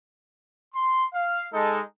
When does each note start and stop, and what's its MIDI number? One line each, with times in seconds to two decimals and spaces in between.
0.74 1.05 84
1.13 1.45 77
1.53 1.81 56
1.53 1.81 63
1.53 1.81 69